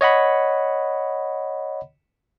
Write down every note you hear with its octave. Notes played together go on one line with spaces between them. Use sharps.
C#5 D#5 F#5 B5